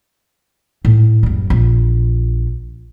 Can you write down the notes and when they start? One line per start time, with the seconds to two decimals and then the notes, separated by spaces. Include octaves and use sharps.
0.85 A2
1.23 F#1 G3
1.50 A#1